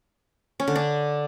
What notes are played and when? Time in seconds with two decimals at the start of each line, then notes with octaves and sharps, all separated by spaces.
0.60 C#4
0.68 D3
0.76 D4